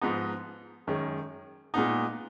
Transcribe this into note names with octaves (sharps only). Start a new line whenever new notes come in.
G#2 F3 B3 D#4
F#2 D#3 G#3 C#4
A#2 G#3 B3 D#4